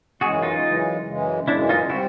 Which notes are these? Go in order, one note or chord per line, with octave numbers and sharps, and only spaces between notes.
F#2 C#3 E3 G#3 F#4 G#4
D#4 F4
F#2 C#3 E3 G#3
F#2 C#3 E3 G#3
F#2 C#3 E3 G#3 D4 E4
D#4 F4
G3 C4 E4 F#4